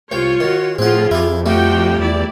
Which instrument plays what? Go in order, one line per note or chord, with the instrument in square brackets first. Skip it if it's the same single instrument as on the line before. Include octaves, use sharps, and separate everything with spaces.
[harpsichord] C2 G5 [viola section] F4 C#5
[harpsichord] D#3 [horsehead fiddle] F#4
[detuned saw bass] A2 [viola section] F3 F4 [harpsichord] C4 F#5 [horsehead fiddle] G#4
[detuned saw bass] F2 [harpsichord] E4 G4
[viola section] F3 F#4 G5 [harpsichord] G3 A3 [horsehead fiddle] G4
[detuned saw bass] E2 [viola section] E4 D5